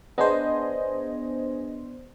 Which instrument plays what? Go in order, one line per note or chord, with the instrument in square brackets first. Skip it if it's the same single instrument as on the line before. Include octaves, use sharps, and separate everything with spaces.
[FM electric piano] B3 D4 C5 [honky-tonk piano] G#4 D#5